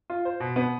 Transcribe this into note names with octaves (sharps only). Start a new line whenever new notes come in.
F4
C5
B2
B3